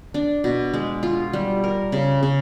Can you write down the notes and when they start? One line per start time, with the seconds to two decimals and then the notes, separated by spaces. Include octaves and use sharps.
0.14 D4
0.44 B2
0.74 G#3
1.03 F4
1.33 G3
1.64 A#4
1.92 C#3
2.23 C#3